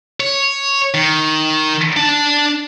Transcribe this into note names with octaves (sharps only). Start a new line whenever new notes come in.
C#5
D#3
D4 A5